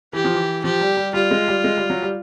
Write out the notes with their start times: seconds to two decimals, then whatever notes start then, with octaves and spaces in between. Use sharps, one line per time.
0.13 E3 G4
0.25 F3
0.34 E3
0.64 F3 G4
0.81 G3
0.97 G3
1.14 G3 F4
1.31 G#3
1.48 G3
1.64 G#3
1.77 G3
1.90 F#3
2.02 G3